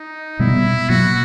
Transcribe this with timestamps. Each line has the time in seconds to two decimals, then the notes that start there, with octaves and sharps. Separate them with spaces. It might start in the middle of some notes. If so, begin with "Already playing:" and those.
Already playing: D#4
0.39 B2 G3 B3 E4
0.89 B2 F#3 A#3 F#4